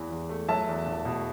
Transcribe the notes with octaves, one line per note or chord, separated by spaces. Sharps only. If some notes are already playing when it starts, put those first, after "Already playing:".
Already playing: E2 E3
E2
A3
F#3 E5 A5
E2
E1
B2